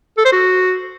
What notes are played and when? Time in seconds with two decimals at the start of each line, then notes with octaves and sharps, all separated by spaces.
0.18 A4
0.25 C5
0.32 F#4